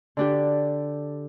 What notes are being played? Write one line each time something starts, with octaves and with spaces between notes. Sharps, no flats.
D3 D4 G4